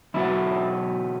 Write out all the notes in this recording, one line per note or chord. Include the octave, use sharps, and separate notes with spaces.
E2 B2 F#3 B3 E4